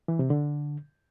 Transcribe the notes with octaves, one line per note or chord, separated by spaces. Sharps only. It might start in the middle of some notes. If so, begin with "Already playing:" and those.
E3
C3
D3